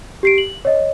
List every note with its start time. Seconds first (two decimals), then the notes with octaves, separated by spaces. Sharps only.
0.23 G4 C7 D7
0.38 F#7
0.65 C#5 D#5